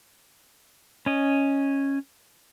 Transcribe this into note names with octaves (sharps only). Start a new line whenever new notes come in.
C#4 D#5